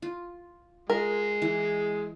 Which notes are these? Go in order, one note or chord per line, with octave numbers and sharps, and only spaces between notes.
F4
G#3 F4 A#4
E3